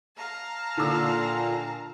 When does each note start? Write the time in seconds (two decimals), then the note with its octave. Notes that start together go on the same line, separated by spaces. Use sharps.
0.16 F5 A5 A#5
0.77 A#2 D3 E6